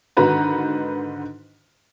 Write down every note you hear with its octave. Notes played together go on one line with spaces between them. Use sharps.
G#2 D3 D#3 F#4 B4 A#5